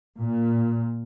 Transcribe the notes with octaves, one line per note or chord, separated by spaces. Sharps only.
A#2